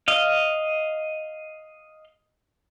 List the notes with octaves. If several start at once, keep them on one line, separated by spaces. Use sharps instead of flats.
D#5 F5